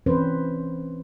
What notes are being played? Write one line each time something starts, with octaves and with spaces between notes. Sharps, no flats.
E3 C4 C#4 B4 C5